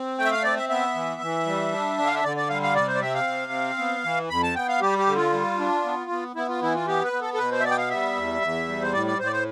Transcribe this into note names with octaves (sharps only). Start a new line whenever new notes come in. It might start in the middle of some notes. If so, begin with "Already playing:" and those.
Already playing: C4
A3 G5
E5
F5
C4 D5
E5
B3 E5
E3
E3
G3
D4
D3
F5
E5
D3 D5
D5
G3 F5
F5
C3 D5
C5
D5
C4 E5
F5
C3
C4
B3
E3
F2 B5
A5
B3 G5
F5
G3 G4
G4
D3
F4
G3
D4
B3
B3
B3 E4
F4
E3 E4
F4
B3 G4
B4
B3
A4
A4
B2 B4
C5
E5
B3 D5
G5
F5
G3 E5
E2
E2
G3
C5
A2 D5
D5
A2 C5
D5
C5